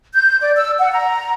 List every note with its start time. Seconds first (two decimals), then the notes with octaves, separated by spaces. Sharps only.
0.14 G6
0.41 D5
0.56 E6
0.80 F#5
0.92 A#5